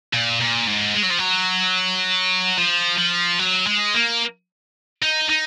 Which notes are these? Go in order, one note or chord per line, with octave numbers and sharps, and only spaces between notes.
A#2
A#2
G#2
G#3
F#3
F3
F#3
F3
F3
F#3
G#3
A#3
D#4
D#4